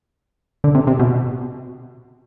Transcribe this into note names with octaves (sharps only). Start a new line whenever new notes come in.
D3
C3
C3
B2